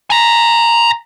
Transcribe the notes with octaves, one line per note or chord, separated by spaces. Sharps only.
G#5 A#5